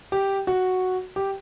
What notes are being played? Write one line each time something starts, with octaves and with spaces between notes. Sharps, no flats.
G4
F#4
G4